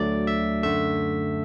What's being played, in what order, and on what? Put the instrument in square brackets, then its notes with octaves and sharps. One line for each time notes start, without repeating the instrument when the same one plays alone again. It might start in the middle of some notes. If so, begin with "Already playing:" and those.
Already playing: [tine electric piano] D2 D3 F#3 A3 D5
E5
F#2 D3 A3 E5